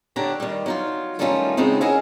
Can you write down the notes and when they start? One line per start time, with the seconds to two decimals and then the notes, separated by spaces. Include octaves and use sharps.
0.16 D3 D4 G4 C#5 A#5
0.40 D#3 G3
0.66 F#3 D#4 F4
1.19 D#3 G3 A3 C#4 D#4 F4
1.57 C#3 G#3 B3 C4 D#4
1.81 C#4 E4 G#4 A#4 D#5 F#5